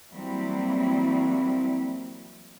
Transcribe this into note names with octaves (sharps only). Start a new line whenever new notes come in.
E3 F#3 G3 A#3 C4 E4